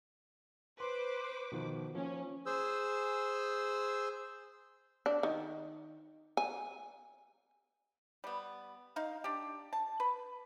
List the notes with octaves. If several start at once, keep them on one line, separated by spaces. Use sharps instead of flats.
B4 C5 C6 D6
B2 D#3 F3
F3 A#3 C#4
G#4 C5 E6
D4
D#3
G#5
G3 B3
D#4 F5
D4 G4
A5
B4